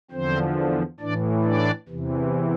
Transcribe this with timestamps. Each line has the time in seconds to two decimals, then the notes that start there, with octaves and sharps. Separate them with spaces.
0.11 E2 D3 F3 C4 C5
1.00 A2 E3 D4 D5
1.44 D4 D5
1.89 E2 C3 E3